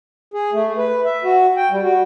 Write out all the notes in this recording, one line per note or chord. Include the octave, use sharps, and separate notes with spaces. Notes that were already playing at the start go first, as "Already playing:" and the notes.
G#4
A3
B4
E5
F#4
G5
G3
F#4